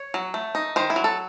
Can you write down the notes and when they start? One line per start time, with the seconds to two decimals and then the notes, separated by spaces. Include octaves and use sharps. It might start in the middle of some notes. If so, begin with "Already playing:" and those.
Already playing: C#5
0.14 F#3
0.34 A3
0.55 D#4
0.76 D#3 C5
0.90 E4
0.96 F#3
1.04 A4